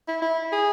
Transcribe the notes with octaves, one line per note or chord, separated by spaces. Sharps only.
E4
E4
G#4